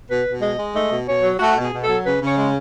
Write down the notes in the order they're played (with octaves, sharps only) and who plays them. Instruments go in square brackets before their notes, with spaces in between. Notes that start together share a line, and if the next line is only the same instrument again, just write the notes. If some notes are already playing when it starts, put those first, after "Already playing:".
[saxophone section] B2 B4
B2
G#3 D#5
G#3
A3 D#5
B2
B2 C#5
F#3
A3 F#4
B2
G#4
B2
A4
F#3
C#3 B4
C#3 C#5
G#3